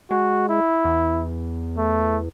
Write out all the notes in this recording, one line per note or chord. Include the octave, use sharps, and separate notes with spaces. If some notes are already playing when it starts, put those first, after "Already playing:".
G#3 F#4
E4
E2
A3